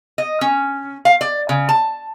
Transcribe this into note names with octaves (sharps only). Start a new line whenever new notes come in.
D#5
C#4
F5
D5
C#3
A5